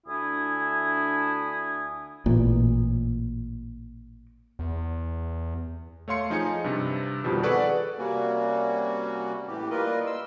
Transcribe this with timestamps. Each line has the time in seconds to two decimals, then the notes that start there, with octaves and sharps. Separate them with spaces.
0.06 D2 D4 E4 G#5 D#6
2.26 A1 A#2
4.59 E2
6.08 A3 C#5 F5 C6 C#7
6.30 F3 D#4 G#4 G#5 C#7
6.64 G2 C3
7.24 F2 B2 D#3 F3 G3
7.43 G#4 A4 B4 D5 F#5 C#6
7.98 C3 G3 A#3 C#4 F#4
9.48 A2 E3 G4
9.70 G3 A#3 F4 A#4 B4 D#5
10.07 C6 E6